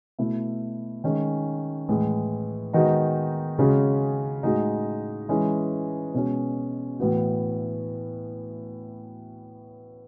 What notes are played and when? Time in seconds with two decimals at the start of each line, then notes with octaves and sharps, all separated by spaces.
0.19 B2 A3 E4
1.04 D#3 G#3 C#4
1.89 A2 E3 G#3
2.73 D#3 G#3 B3 D#4 F#4
3.59 C#3 G#3 C#4 F#4
4.43 A2 G#3 D#4 F#4
5.29 E3 G#3 C#4 E4
6.14 B2 G#3 C#4
6.99 A2 E3 B3 F#4